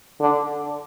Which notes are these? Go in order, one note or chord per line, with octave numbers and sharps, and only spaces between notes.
D3